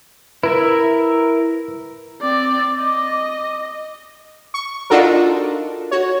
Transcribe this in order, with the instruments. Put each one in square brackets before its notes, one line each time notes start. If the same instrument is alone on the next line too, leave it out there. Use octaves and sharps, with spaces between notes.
[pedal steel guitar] E4 A#4 E5 [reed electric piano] B4
[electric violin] C4 D5 [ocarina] D6
[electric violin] D#5
[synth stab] C#6
D4 D#4 F4 F#4 A4 A#4
F#4 C#5